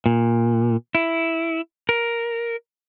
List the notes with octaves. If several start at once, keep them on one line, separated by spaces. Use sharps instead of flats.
A#2
E4
A#4